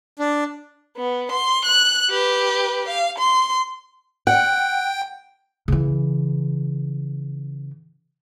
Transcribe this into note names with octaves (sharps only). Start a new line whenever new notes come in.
D4
B3
C6
F#6
G4 B4
F5
C6
F#5 G5
C#3 E3